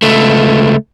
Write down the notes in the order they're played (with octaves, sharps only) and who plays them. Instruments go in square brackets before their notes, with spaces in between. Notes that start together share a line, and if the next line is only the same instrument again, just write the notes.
[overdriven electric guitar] C#2 A3